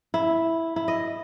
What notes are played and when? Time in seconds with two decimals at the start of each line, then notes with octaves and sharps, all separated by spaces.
0.14 E4
0.76 E4
0.88 D#5